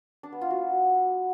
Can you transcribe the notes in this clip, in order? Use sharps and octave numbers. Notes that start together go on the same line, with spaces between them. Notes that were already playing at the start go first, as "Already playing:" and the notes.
D4
B3
F4
F#4